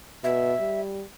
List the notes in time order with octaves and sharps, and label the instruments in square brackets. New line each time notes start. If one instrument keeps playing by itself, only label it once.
[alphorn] B2 [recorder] E5
[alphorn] G3